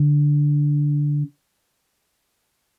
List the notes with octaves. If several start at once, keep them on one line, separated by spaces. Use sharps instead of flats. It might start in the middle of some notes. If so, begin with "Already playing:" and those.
Already playing: D3